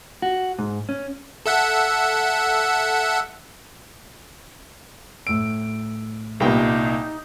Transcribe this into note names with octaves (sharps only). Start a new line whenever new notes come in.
F#4
G#2
C#4
A4 E5 F#5
A2 E6 D7
C2 A#2 G3 B3 D#4 G5